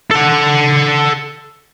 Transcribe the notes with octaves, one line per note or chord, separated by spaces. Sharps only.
A4 F#5